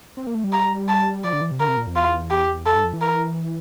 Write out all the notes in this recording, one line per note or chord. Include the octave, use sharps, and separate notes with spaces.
C4
A#3
A3
G3
A#5
A5
F3 D5
D3
E3
C3
D3 A#4
C3
A#2
F2
E2 F4
G4
F2 A4
G2
F2
E3
A#4